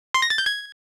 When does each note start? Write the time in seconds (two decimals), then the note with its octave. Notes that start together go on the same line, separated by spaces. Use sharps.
0.14 C6
0.22 A#6
0.30 A6
0.38 G6
0.46 G#6